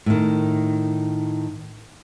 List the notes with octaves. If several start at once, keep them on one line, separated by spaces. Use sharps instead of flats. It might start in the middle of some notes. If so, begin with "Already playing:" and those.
A2 D#3